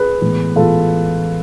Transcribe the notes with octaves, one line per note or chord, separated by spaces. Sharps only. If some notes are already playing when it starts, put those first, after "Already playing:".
Already playing: G#4 B4
A2 E3 G#3 B3
A2 E3 G#3 B3 F4 A4